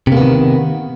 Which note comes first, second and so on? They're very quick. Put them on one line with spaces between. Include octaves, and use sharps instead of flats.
C3 A#3 B3 D#3